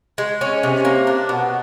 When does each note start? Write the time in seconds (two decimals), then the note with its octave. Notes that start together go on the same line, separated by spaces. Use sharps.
0.18 G#3
0.41 C#4
0.63 C3
0.85 A#3
1.07 D4
1.29 B2